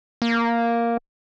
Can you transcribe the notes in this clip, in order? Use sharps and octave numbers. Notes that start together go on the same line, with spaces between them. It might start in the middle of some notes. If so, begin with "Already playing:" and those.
A#3